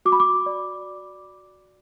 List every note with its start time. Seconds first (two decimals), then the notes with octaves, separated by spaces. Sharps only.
0.05 F#4 D6
0.12 B5
0.20 D6
0.46 D5